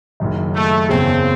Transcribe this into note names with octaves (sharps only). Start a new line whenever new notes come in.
F#1 F#2 D#3
A3
F#1 E2 C#3 C4